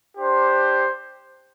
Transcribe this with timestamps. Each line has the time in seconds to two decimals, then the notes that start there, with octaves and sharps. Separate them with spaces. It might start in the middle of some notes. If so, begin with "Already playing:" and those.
0.18 D4 G4 C5